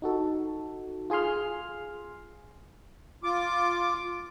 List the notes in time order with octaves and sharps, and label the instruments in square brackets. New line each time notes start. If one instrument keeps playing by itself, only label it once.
[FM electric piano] D#4 F#4 A4
F4 G#4 G#5 C6 F6
[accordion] F4 D6